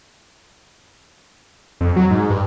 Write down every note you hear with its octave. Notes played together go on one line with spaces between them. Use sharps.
F2
F#3
G#2
G2